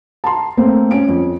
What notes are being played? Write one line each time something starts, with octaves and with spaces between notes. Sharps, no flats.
A5 A#5 C6
A3 A#3 C4
C#4 D7
F2